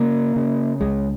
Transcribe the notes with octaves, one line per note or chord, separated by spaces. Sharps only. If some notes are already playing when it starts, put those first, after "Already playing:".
Already playing: C#3 A#3
C#3
C#2 G#3